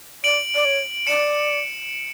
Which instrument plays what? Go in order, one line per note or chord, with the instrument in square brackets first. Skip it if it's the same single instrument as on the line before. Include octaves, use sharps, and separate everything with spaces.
[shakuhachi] D5 [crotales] D7 F#7
[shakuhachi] D5
C#5
[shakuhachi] D5 [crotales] C#7 E7